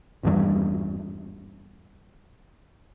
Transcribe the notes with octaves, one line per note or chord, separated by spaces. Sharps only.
G#1 E2 G2